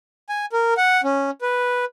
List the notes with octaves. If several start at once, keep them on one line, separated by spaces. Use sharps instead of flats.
G#5
A#4
F#5
C#4
B4